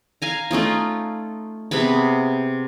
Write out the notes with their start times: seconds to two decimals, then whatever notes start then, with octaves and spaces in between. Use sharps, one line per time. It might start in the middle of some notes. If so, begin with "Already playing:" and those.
0.22 F5 G#5 A#5
0.51 A3 C#4 D#4 F4
1.71 C3 B3 G#4 B5